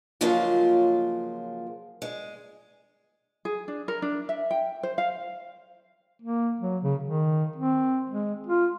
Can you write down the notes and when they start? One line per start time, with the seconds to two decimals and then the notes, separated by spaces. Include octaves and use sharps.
0.21 C#3 F3 F#3 G#3 A#3 F4
2.02 G#3
3.45 G#4
3.68 D4
3.88 A#4
4.02 D4
4.29 E5
4.51 G5
4.83 C5
4.98 F5
6.22 A#3
6.60 F#3
6.83 C#3
7.03 D#3
7.56 C4
8.10 G#3
8.47 F4